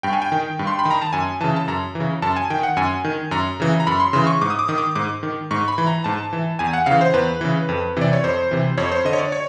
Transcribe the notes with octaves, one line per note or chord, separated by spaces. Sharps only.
G2 G5
G#5
G5
D#3
G2
C6
B5
D#3
A#5
A5
F#2 G#5
C#3 E3 A5
A5
F#2 A#5
E3
C#3
F#2 A5
G#5
D#3 G5
F#5
F#2 G#5
D#3
F#2 A#5
C#3 E3
A#5
F#2 B5
C6
C#3 E3 C6
C#6
G#2 D6
D#6
D6
D#3 D#6
D6
G#2 D6
D#3
G#2 C#6
B5
E3
A#5
G#2 A5
E3
E2 G#5
F#5
C#3 E3 F5
C5
E2 B4
C#3 E3
F2
C3 E3 D5
C#5
F2 C5
C3 E3
F2 C#5
C5
D3 D#5
C#5
D5
C#5